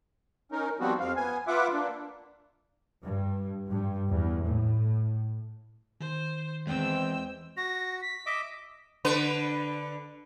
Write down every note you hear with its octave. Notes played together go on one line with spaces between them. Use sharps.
C#4 D#4 A#4
F3 G3 B3 C4 F#4
F2 C4 F5
B3 G#5
F4 B4 E5 F#5 D6
A#3 D4
G2
G2
E2
A2
D#3 C5
E2 G#3 C4 G5 E6
F#4 A#6
B6
D#5 E5 D6
D3 B4